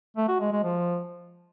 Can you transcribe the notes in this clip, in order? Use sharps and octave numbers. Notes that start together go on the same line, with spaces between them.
A3
F#4
G#3
G#3
F3